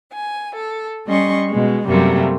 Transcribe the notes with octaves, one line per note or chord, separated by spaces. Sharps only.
G#5
A4
G3 C#4 D#5 C6 C#6
B2 G#3
F#2 C3 F#3 G3 A3 A#3